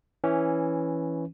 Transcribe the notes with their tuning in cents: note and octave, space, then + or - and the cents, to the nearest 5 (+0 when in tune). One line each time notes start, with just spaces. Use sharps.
E3 +0 C#4 +0